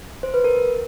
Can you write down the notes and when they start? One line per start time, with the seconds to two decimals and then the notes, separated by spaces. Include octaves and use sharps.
0.23 C5
0.34 B4
0.44 A#4